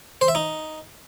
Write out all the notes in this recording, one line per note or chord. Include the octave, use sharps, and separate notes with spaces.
C5
E5
D#4